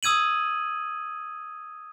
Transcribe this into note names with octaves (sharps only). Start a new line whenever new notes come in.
D#6 E6 G#6 D#7 F#7